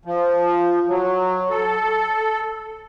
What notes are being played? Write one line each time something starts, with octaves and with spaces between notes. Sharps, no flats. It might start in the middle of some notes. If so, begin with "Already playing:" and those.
F3
F#3
A4